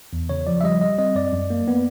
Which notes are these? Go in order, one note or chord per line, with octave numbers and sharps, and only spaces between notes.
E2
C#3 C#5
F3 D5
E5
G3 D#5
G3 D#5
C4 D#5
F#2 D5
F#2
A#3
B3